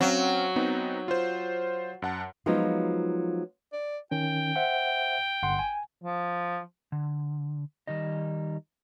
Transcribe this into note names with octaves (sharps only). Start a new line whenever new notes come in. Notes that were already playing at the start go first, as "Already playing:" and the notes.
F#3 C4 C#4 F5
B3 C4 D#4
F4 C5
F#2 F#5 A5
F3 F#3 G#3 B3 D#4 F4
D5
D#3 C#4 G5
C5 E5 F#5
G1 F#5 C6
G#5
F3
D3
D#3 G3 D#4 D#5